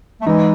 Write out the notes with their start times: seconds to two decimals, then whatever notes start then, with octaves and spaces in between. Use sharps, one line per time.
0.21 A3
0.26 E3 G#3 D#4